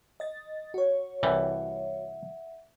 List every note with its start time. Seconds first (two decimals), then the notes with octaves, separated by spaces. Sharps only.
0.20 D#5 A6
0.74 F#4 C#5
1.23 C2 E3 G3 E5 F#5